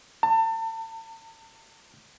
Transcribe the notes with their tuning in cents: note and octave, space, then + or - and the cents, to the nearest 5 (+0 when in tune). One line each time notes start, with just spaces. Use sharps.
A5 +40